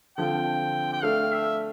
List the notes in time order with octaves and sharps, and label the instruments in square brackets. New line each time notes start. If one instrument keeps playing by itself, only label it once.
[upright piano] D3 F3 C4 F4 [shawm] G5
[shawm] G5
[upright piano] A3 D4 A4 [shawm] F5
[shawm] E5